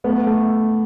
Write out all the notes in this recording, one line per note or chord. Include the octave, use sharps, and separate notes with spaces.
A3 B3
A3